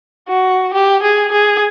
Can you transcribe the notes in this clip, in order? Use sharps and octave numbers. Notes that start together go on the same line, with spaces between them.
F#4
G4
G#4
G#4